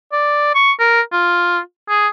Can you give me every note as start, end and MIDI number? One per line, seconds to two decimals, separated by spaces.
0.12 0.54 74
0.55 0.72 85
0.80 1.01 70
1.12 1.59 65
1.89 2.08 68